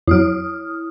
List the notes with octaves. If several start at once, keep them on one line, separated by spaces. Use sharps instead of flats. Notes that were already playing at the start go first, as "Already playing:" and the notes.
F2 F#3 E4 D#6 F6